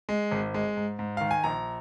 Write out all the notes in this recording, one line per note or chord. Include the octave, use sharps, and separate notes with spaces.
G#3
G#1
G#3
G#2
G#2
D#3 F5
G#5
A#1 A#5